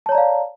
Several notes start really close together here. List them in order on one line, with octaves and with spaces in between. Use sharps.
A5 C#5 A#5 D5 F5